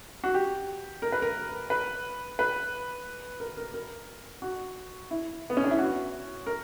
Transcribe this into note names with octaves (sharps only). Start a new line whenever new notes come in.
F#4
G4
A#4
B4
A#4
B4
B4
A#4
A#4
A#4
F#4
E4
B3
C#4
D4
E4
F#4
A#4